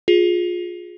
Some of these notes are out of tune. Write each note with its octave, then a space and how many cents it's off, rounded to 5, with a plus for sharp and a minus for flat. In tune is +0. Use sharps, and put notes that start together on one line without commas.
F4 +20 G#4 +0